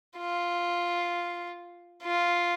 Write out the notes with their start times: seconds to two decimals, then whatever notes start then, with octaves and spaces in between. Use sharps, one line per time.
0.18 F4
2.03 F4